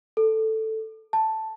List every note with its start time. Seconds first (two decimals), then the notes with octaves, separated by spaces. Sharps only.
0.17 A4
1.13 A5